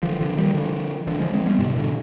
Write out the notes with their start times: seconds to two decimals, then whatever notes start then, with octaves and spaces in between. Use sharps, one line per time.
0.03 D3 F3
0.21 D3 F3
0.37 D#3 G3
0.54 D3 F3
1.07 D3 F3
1.20 F3 G#3
1.34 G#3 C4
1.46 G3 B3
1.59 G#2 C3
1.76 B2 D3